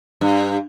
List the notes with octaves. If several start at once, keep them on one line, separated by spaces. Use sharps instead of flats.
G2